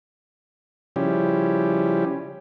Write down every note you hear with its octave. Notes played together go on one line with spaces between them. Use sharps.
C#3 F3 G3 C#4 E4 G4